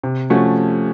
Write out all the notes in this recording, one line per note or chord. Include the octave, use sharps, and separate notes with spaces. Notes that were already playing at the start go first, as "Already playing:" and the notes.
C3
F3 A3 C#4 F#4